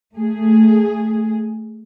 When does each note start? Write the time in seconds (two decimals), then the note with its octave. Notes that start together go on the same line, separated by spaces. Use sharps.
0.14 A3 G#4